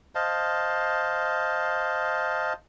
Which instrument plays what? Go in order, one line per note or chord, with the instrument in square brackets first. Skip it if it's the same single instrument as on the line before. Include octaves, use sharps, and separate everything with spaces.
[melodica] C5 D#5 F5 A5